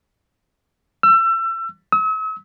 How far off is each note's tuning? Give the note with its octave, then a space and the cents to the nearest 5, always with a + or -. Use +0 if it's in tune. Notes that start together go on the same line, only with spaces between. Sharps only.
E6 +30
E6 -45